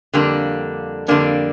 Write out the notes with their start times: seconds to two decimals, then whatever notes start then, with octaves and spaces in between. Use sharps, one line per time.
0.13 F2 D3 G3 A#3 D4
1.08 F2 D3 G3 A#3 D4